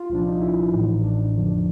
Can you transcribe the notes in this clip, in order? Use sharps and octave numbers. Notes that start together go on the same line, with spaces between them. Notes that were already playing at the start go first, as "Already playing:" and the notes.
Already playing: F4
C2 A#2 F3 D4
D#4
E4
D#4
A1 A2 E3
D4
F2 D3 F3